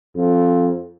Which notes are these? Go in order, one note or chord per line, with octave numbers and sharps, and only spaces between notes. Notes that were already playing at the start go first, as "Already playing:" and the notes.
F2